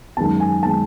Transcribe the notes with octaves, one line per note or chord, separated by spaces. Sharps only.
F#2 D#3 G#3 B3 A5
G#5
D#3 G#3 B3 A5